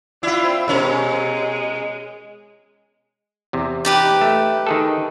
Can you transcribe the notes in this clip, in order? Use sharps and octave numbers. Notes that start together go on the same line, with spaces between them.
D4 E4 F4
C4
B2 G#3 C#4 A#4
E2 C3
D#4 G4 B4
A3
D#3 G#4 A4